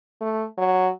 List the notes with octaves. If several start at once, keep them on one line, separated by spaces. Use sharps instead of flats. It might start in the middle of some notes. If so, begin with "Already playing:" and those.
A3
F#3